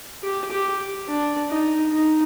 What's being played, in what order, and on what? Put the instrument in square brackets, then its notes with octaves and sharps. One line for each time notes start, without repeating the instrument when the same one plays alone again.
[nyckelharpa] G4
G4
D4
D#4
D#4